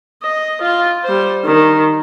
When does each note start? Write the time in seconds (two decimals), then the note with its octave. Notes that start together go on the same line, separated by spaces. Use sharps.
0.23 D#5
0.61 F4
1.04 G3 C5
1.44 D#3